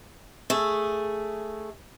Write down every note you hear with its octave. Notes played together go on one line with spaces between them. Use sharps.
A3 G#4